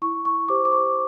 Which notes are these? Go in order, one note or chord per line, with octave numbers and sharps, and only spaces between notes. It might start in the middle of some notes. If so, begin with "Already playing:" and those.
E4 C#6
C#6
G4 C5 D6
D6
C#6